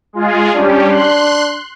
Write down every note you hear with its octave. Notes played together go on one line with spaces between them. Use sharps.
G#3 F4 G#4
G3 C#4 D4 G4
C6 F#6